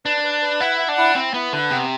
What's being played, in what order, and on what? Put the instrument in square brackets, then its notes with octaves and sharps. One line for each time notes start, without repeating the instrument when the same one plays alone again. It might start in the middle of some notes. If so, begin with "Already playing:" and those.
[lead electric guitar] D4 [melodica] B4
[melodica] B4
B4
[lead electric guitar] E4 [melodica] F#5
[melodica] F#5
[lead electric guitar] D4
[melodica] E4
[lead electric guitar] C4 [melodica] E4
[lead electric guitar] B3 [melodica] E4
[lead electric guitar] D3 [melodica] B4
[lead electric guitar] C3 [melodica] B3